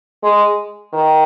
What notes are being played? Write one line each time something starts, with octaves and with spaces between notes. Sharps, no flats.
G#3
D#3